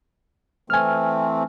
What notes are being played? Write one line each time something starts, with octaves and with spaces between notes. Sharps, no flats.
E3 A3 C4 G#5 F6